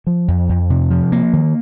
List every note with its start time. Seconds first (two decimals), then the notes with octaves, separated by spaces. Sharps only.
0.07 F3
0.28 F2
0.49 F2
0.70 C3
0.90 F3
1.12 A#3
1.33 D#3